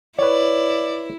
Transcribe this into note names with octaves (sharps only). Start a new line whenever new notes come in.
E4 B4 C#5 D5